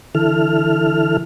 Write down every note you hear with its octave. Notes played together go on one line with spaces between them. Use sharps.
D3 E3 E4 A4 F6